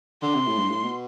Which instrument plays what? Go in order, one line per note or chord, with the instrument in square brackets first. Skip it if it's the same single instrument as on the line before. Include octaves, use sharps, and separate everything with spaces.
[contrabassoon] D3 [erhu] C6
[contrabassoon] C3
A2
G2
A2
B2